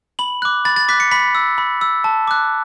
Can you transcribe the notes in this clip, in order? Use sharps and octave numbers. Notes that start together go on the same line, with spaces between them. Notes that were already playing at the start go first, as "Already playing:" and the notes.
B5 F#7
D6 F#6
B5 A6
A6
D6 F#6 B6
C#7
B5 B6
E6
B5
E6
A5
D6 F#6